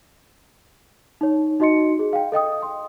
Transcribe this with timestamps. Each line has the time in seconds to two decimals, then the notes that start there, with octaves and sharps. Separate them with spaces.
1.21 D#4 C#5
1.60 D#4 F#4 D#5 C6 C#7
1.99 G#4
2.13 F5 G5
2.32 A4 D#5 G5 D#6
2.63 C6